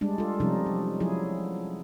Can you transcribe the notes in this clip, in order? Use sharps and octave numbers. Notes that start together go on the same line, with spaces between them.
G3 G#3 D4
F4 A4
C3 F3 G3 C#4 D#4
F#3
F3 F#3 E4 G#4